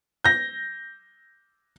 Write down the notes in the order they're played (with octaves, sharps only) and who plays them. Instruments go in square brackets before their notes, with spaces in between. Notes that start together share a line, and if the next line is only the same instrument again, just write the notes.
[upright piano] G6 A#6